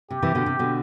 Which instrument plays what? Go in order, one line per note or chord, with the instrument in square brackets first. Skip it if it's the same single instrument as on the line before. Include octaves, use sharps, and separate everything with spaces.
[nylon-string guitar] C3 [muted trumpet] G4
[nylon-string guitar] C3 E3
B2 D3
C3
B2 D3